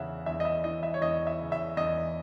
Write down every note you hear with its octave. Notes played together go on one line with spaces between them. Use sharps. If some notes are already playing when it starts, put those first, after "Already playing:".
Already playing: E2 C#3 E5 F#5
E2 E5
D#5
E5
E3 D#5
E5
C#5
E2 D#5
E5
C#3
E5
E2 D#5